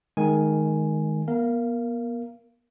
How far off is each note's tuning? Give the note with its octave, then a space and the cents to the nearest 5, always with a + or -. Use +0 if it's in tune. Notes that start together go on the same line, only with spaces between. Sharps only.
D#3 +0 G#3 +20 G#5 +0
B3 -40 A#4 +0 F5 -25